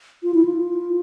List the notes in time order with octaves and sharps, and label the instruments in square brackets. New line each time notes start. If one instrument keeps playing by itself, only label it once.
[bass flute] F4
E4
F4